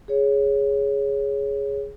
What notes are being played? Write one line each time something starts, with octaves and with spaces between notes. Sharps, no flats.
G#4 C#5